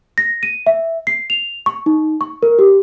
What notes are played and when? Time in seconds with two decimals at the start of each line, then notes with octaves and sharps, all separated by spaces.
0.18 A#6
0.43 D#7
0.66 E5
1.07 C7
1.30 F7
1.66 C#6
1.86 D#4
2.21 C#6
2.43 A#4
2.59 G4